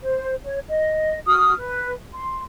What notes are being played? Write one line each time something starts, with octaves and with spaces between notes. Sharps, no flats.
C5
C#5
D#5
F#4 D#6 F6
B4
C6